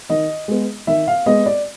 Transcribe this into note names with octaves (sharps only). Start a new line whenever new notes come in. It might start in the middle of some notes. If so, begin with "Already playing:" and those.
D#3 D#5
G#3 B3
D#3 E5
F5
G#3 B3 D#5
D5